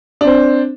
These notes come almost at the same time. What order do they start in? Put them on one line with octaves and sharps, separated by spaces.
D4 C4 C5